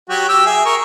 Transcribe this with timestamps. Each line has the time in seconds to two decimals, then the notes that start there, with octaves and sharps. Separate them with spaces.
0.09 F#3 F#4 G4
0.29 G4 E6
0.46 G#4 E5
0.65 A#4 C#6